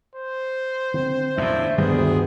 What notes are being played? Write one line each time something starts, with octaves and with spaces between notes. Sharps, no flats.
C5
D3 C4
E2 A2 D3 A#3 D4 E5
D2 G2 D#3 G3 B3 G#4